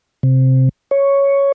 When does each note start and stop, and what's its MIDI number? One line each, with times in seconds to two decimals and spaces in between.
0.23 0.69 48
0.91 1.52 73